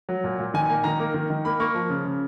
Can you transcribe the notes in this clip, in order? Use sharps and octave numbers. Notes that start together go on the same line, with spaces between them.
F#3
A#2
A#2
D#3 G#5
A#3 G#5
D#3 A#5
A#3
D#3
D#3
A#3 B5
A#3 C#6
F3
C#3
C#3